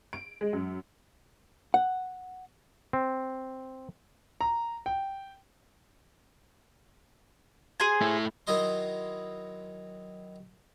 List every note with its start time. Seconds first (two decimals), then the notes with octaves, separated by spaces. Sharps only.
0.13 D7
0.41 G#3
0.53 F#2
1.74 F#5
2.93 C4
4.41 A#5
4.86 G5
7.80 G#4 C5 G#5
8.01 A3 E4
8.47 D#3 F#3 E4 D#5 C6